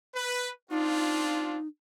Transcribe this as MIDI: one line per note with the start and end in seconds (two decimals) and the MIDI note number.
0.14 0.49 71
0.71 1.56 60
0.71 1.56 62
0.71 1.68 63
0.71 1.56 65